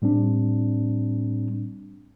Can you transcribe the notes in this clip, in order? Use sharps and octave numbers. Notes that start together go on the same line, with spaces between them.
A2 G3 C4 D4